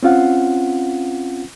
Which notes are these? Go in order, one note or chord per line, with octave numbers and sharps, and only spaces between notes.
C4 C#4 F4 F5 F#5